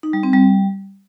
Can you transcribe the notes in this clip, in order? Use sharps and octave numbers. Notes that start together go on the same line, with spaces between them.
D#4
G3
C4
G3